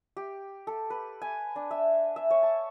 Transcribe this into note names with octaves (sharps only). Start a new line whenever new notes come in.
G4
A4
B4
G#5
D4
E5
E5
C#5
A5